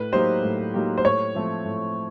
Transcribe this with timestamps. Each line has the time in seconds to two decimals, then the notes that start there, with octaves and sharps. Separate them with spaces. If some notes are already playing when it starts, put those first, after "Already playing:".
Already playing: A2 B4
0.12 F#3 A#3 D#4 G4 C5
0.43 A2
0.74 F#3 A#3 D#4 G4
0.98 C5
1.04 A2 C#5
1.35 F3 A3 C4
1.65 A2